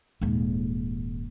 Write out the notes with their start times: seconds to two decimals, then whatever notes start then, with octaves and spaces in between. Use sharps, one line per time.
0.21 D#1 G#2